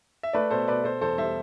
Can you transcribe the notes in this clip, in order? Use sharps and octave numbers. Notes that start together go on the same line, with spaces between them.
E5
A3 B4 D5
B2 A4 C5
B2 B4 D5
B2 A4 C5
E2 A4 C5
G3 C5 E5